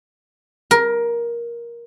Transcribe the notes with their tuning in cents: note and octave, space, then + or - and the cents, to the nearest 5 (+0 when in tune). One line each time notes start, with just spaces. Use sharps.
A#4 +15